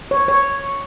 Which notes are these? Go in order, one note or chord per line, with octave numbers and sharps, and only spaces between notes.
C#5
C#5